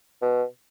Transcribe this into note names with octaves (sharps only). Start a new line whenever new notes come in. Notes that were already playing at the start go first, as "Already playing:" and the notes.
B2